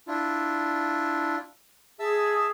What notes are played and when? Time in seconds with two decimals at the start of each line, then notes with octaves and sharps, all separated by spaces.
0.08 D4 E4 F4
2.00 G#4 E5 A5 E6